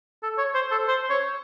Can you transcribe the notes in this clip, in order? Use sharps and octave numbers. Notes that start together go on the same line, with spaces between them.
A4
C#5
C5
A4
C5
C#5